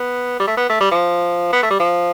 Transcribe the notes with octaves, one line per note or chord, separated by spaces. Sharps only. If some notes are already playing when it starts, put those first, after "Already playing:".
Already playing: B3
G3
A3
B3
A3
G3
F3
B3
A3
G3
F3